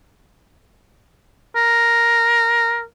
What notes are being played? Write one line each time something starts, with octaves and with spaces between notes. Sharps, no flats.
A#4